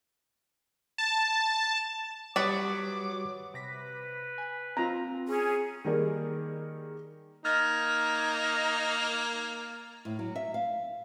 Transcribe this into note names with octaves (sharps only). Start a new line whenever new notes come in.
A5
F#3 G3 G4 B4 D5 D6 D#6
C3 B4 A#6 B6
G#5
C4 F4 A#5
C#4 G#4
D#3 G3 A#3 G#4 A#4 D5
A#3 D#4 F6 G#6 A6
A2
F#3
E5
F5